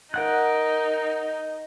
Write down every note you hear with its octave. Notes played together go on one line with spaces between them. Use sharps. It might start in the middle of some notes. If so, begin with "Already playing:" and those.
D#4 A#4 F#5 F#6